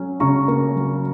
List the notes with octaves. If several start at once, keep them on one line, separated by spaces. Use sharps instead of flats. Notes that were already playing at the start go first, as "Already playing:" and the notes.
Already playing: F#3 C#4
C#3 A#5 C#6
A#3
F#3